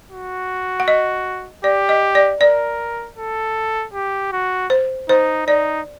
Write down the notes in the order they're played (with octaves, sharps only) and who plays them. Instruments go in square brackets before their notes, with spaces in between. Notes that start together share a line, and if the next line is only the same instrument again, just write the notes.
[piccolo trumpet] F#4
[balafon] F#5
D#5
[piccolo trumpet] G4 [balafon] D5
[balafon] D#5
D5
[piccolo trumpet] A#4 [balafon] D5
[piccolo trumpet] A4
G4
F#4
[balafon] C5
[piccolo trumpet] D#4 [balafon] C5
[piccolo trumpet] D#4 [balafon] D5